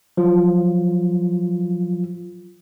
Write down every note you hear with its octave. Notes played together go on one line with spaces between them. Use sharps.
F3 F#3 F4